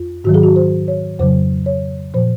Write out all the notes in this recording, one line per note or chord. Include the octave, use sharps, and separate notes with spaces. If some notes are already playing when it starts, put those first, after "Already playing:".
Already playing: F2 F4
G#2 D#3 F#3 F#4
G#4
F#4
C5
C#5
F2 C#3 F#3 C5
C#5
A#2 F3 C5